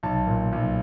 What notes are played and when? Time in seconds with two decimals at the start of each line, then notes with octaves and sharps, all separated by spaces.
0.03 B1 A5
0.27 A#2
0.52 B1